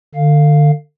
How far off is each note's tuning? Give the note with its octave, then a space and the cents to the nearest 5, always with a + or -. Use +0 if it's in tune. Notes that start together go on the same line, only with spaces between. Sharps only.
D3 +30 F5 +0